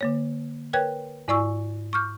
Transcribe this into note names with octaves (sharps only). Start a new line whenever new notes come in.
D3 A#3 C#5
A#4 B4 C#5 G5 F#6 G#6
G#2 E4 D5 G#5 C#6 E6
C#6 D6 F6 G6